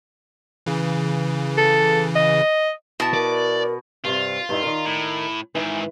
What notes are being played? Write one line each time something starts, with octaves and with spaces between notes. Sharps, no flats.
C#3 E3
A4
D#5
B2 E4 A5
A#4 D5
G2 C3 F4
G2 D#4 E4
D#3 A#4
A2
G#2 D#3 E3